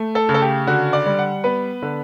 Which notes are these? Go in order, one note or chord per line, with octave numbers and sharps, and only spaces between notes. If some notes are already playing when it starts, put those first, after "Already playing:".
Already playing: A3
A4
C#3
A4
G4
D3 F#4
D5
G3
F#5
B3 B4
D3